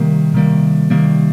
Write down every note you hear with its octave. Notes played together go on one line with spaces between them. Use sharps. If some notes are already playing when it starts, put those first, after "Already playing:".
Already playing: C3 D#3 G3 A#3
C3 D#3 G3 A#3
C3 D#3 G3 A#3